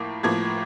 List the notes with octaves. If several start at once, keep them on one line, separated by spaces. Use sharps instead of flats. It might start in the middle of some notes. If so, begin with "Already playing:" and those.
Already playing: A2 F3 A#3
A2 F3 A#3 G#6